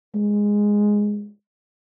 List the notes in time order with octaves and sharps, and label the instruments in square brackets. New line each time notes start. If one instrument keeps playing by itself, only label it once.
[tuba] G#3